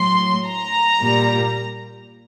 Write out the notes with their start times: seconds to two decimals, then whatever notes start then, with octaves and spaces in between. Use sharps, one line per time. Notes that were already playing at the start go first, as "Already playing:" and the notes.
Already playing: A2 F#3 C6
0.46 A#5
1.01 A#2 G3